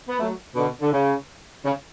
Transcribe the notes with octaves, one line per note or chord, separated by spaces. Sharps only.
B3
F#3 A3
B2 D3
D3
C#3
C#3